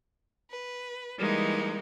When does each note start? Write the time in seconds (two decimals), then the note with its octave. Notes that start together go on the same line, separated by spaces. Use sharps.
0.49 B4
1.18 E3 G3 G#3 A#3 D#4